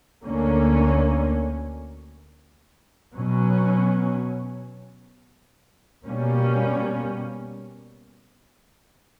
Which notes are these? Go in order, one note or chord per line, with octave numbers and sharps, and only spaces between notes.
D2 D3 A#3 C#4
B2 F#3 C#4
B2 G3 A#3 C#4